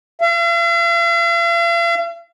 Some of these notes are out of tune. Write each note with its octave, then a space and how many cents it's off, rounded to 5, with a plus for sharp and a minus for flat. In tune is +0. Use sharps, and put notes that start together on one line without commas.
F5 -45